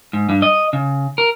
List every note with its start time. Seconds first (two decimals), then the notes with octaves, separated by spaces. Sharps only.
0.13 G#2
0.29 G2
0.42 D#5
0.73 C#3
1.18 A#4